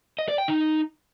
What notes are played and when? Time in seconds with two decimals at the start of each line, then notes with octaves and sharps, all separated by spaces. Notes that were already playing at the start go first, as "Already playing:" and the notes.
0.19 D#5
0.28 D5
0.38 G5
0.48 D#4